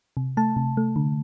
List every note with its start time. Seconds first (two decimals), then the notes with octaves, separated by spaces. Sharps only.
0.17 C3
0.37 A3 A5
0.56 C3
0.77 A3
0.96 D3